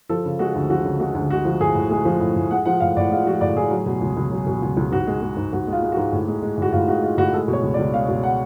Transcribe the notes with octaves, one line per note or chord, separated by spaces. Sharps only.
F3 A4
C#3
G#3 F#4
D2
F3 F#4
C#3
G#3 F#4
D2
G#3 F#4
F3
A2 G#4
A2
G#3 G#4
F3
A2
A2
G#3 F#5
F3 F#5
A2 F5
A2 D5
G#3 F4
F3 F#4
A2 D5
A2 G#4
F#3
B2
C#2
C#2
F#3
B2
C#2
C#2
G#2 F#4
G#3
G#3
G#2
G#2 F#4
G#3
F4
G#3
G#2 F#4
A2
G#3
G#3
A2 F#4
A2 F4
G#3 F#4
G#3 F4
A2 F#4
G#3 A4
B2
C#5
C#2
D5
C#2
G#3 F5
B2
F#5